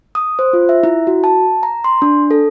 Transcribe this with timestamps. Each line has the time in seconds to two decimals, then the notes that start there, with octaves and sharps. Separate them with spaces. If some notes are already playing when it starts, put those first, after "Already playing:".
0.15 D#6
0.39 C5
0.53 F4
0.69 E5
0.84 E4
1.07 F#4
1.24 A5
1.63 A#5
1.84 C6
2.02 D4
2.31 A4